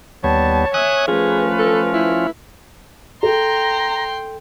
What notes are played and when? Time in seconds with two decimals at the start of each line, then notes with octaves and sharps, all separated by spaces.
0.24 D#2 G3 B3 C#5 A5
0.74 E5 G#5 D#6 F#6
1.08 F3 A3 C#4 F4 G#4 B4
1.59 A4
1.93 E4
3.23 A4 G5 A#5 C6